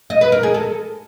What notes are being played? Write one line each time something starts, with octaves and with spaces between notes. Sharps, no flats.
D#5
B4
A#4
G#4
A4